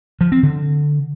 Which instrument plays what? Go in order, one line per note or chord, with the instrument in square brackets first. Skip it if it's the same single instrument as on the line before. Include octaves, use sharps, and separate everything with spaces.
[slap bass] F3
C4
D3